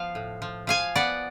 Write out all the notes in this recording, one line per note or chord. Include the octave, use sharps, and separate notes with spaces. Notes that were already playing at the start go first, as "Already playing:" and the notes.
Already playing: F3 B3 F5
A2
F3
F3 F5 G#5
B3 D5 F#5